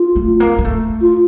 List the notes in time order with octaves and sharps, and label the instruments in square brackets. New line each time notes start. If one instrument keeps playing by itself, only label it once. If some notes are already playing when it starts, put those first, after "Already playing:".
Already playing: [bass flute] F4
[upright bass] A3
A#3
A#3
A3
[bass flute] F4